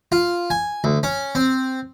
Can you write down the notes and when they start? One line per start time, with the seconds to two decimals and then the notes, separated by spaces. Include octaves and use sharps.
0.12 F4
0.50 G#5
0.84 D2
1.03 C#4
1.35 C4